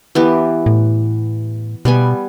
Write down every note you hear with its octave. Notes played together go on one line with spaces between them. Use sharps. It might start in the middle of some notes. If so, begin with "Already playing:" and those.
E3 B3 G4
A2
B2 G3 B3 G#5